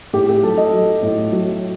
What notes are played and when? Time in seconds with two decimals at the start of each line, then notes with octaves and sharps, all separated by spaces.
0.13 A2 G4
0.29 G4
0.43 F#3 A4
0.57 D#5
0.73 F#3
1.02 A2
1.32 F#3